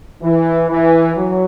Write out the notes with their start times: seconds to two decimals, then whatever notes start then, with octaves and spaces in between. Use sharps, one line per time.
0.23 E3
0.69 E3
1.16 F#3